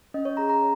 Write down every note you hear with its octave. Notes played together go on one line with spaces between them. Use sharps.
C#4 D#5
C#5
G#4 A#5
A#5